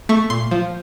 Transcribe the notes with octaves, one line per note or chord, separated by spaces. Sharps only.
A3 C#6
A#2 C6
F3